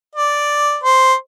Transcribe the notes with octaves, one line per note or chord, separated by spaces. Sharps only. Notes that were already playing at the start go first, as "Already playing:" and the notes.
D5
C5